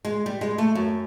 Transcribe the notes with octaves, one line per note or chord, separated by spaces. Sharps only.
G#3
G3
G#3
A3
F#2